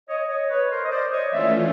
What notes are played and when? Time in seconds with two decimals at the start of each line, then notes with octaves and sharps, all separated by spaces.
0.08 C#5 D#5
0.29 C#5 D#5
0.49 B4 C#5
0.70 A#4 C5
0.84 D#5
0.90 C5 D5
1.11 C#5 D#5
1.31 E3 A3 C#4 F4 D5 E5